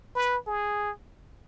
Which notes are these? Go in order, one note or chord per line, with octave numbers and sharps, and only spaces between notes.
B4
G#4